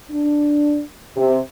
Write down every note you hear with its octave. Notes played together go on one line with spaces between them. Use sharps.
D4
C3